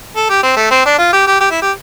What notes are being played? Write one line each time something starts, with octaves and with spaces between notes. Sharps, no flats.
A4
G4
C4
A3
C4
D4
F4
G4
G4
G4
E4
G4